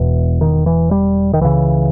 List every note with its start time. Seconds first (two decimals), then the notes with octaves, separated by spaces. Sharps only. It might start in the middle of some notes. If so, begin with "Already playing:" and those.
Already playing: E1 E2 B2 E3
0.41 D#3
0.66 E3
0.91 G3
1.33 D#3
1.41 C#2 C#3 E3